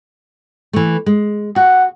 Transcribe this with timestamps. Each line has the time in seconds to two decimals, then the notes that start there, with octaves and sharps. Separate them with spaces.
0.73 E3 A3
1.06 G#3
1.56 F#4 F#5